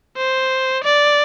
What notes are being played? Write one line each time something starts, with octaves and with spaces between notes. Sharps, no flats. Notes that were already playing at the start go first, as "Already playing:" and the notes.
C5
D5